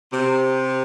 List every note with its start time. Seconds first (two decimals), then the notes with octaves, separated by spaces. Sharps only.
0.13 C3